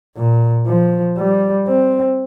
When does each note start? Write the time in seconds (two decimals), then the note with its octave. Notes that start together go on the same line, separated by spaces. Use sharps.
0.17 A#2
0.67 F3
1.17 G3
1.67 C4